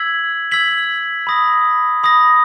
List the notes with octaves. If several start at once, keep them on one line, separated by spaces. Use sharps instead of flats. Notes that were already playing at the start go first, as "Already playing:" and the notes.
Already playing: E6 G#6 B6 F#7
E6 G#6 B6 F#7
B5 D#6 A#6
B5 D#6 A#6